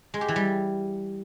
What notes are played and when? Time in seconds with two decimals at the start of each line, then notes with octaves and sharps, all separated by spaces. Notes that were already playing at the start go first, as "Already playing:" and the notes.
0.14 G#3
0.21 G4
0.28 E3
0.36 G3